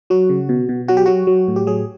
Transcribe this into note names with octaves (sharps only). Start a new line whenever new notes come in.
F#3 F#4
C#3
B2
B2
F#3 F#4
G4
F#3 F#4
F#3
A2
G4
F#3 G#4